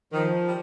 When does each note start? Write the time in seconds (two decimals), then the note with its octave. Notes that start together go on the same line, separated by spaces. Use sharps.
0.12 D#3 F3
0.46 G3